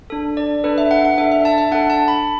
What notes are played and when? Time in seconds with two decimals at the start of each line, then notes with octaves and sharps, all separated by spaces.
0.10 D4 A4
0.37 D5
0.64 D4 A4 B4
0.78 E5
0.91 F#5
1.05 F#5
1.18 D4 A4 E5
1.32 E5
1.45 A5
1.58 E5
1.72 D4 A4 F#5
1.90 A5
2.08 B5